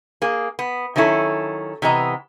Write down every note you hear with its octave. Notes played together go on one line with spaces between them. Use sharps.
A#3 G#4
B3
D#3 F#3 C#4 E4 A4
C3 E3 B3 D#5 A#5